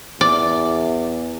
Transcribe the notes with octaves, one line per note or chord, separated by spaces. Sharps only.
E2 D5